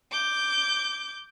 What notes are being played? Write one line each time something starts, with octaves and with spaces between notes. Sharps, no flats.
D6 G6